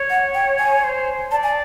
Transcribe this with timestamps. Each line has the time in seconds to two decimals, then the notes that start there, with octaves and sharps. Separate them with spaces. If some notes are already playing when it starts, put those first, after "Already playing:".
Already playing: C#5
0.10 F#5
0.34 G5
0.59 G#5
0.83 C5
1.31 D5 A5
1.43 G#5